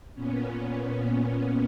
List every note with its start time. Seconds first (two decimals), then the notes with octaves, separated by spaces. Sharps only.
0.15 A#2 B3 C#4